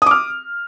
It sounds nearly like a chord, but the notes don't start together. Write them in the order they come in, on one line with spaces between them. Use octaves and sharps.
D#6 D6 F6